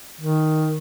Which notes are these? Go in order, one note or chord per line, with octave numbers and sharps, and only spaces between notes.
D#3